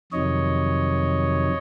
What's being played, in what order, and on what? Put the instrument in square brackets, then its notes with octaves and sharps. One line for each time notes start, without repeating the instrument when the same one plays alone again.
[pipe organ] F2 C3 D#3 F#3 C#5 D#5